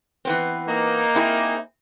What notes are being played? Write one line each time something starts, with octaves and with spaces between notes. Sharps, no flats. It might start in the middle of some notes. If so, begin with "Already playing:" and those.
E3 B3 C4
A#3 D#4
C4 E4 G#4